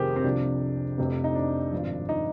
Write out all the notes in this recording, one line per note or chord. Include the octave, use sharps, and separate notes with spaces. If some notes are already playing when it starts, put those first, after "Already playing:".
Already playing: F1 F2 C3 D#3 G4 G#4 A#4 C5
C4
C2 C3 F3 D4
F1 F2 C3
D#4
D4
G#1 G2 F3
D#4